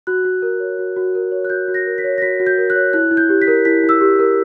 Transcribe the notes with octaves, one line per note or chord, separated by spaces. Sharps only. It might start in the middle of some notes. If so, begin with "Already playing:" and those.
F#4 F#6
F#4
A#4
C#5
F#4
F#4
A#4
C#5
F#6
F#4 G6
F#4
A#6
A#4
B6
C#5
A#6
F#4 B6
F#4
G6
A#4
F#6
C#5
E4 F#6
E4
G6
G4
B6
A#4
E4 B6
E4
E6
G4
A#4